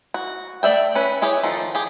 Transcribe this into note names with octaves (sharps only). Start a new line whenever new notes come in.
F#4
A3 D5 E5 G5
C#4 B4
E4 G4 G#4 C#5
D#3 F3 A4
G4 G#4